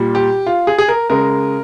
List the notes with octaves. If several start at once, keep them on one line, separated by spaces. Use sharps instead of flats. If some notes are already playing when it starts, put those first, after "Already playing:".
Already playing: A#2 G3
G4
F4
G#4
G#4
A#4
C#3 G#3 A#4